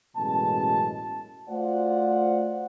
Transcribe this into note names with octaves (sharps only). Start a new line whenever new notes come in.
A1 F#2 B2 G#3 A5
A3 F4 F#4 C5 D5 F#5